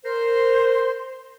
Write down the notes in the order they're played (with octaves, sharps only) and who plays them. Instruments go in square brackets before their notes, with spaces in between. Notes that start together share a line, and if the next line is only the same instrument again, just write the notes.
[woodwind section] A#4 C5